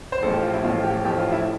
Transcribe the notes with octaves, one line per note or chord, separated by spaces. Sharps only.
C5
A1 A2 F3 A4
G4
F4
E4
A1 A2 F3 F4
G4
A1 A2 F3 G4
F4
E4